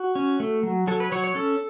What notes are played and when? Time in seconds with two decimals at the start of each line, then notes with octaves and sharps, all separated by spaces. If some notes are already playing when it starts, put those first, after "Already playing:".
Already playing: F#4
0.15 C#4
0.40 A3
0.63 F#3
0.87 F#3 A4
1.00 B4
1.12 F#3 C#5
1.24 C#5
1.35 C#4 A4